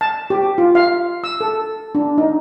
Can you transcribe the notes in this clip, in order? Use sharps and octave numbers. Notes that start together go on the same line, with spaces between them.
A5
G4
F4
F5
E6
A4
D4
D#4